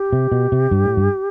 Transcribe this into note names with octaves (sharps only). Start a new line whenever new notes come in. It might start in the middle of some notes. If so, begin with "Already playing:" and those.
Already playing: G4
C3
B2
C3
G2
A2
G2